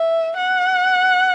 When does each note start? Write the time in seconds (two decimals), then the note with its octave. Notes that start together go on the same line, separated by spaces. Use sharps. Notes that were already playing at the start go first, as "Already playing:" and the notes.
Already playing: E5
0.36 F#5